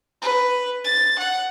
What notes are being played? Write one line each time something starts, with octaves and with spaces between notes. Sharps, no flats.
B4
A6
F#5